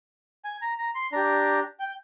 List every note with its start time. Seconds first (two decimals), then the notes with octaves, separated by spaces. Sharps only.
0.45 G#5
0.62 A#5
0.78 A#5
0.95 C6
1.12 D4 G4 A#5
1.80 G5